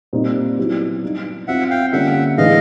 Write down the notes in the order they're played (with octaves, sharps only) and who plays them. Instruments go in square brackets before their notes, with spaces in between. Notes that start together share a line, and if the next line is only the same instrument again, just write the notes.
[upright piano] A#2 G3 C4 D#4
F#3 B3 E4 G4
G3 B3 D#4
[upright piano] G3 C4 F4 [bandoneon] E5 F#5
[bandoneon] F5 G5
[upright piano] D3 G3 A#3 C#4 F4 [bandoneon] E5 F#5
[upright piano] A2 E3 G#3 B3 D4 [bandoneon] D#5 F5